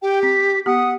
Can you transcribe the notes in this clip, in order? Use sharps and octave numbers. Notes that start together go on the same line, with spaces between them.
G4 G5
C4 B6
B3 G4 F#5 D#6